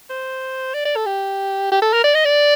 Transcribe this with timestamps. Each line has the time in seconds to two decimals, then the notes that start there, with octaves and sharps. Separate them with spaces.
0.10 C5
0.74 D5
0.85 D5
0.96 A4
1.06 G4
1.72 G4
1.82 A4
1.93 A#4
2.04 D5
2.15 D#5
2.25 D5